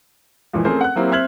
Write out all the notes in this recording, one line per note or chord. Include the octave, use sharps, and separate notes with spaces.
C#2 A#2 E3 F3
A3 C4 C#4 G#4 A#4 C5
F#5 F#6
F#3 A#3 C4 E4 G4
C4 E5 F6 G#6 F#7